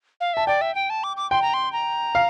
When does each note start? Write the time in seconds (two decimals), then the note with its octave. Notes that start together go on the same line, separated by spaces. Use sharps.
0.21 F5
0.34 E5 A5
0.47 D5 G5
0.61 E5
0.75 G5
0.90 A5
1.04 D6
1.17 D6
1.31 G5 C6
1.42 A#5
1.54 C6
1.73 A#5
2.15 F5